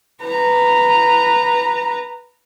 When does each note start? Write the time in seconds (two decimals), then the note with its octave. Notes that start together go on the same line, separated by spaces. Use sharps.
0.24 B4 A#5